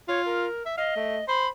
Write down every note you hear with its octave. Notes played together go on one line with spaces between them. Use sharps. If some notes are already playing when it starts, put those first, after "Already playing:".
F4 C#5
A#4
E5
D#5 F5
A3
C5 B5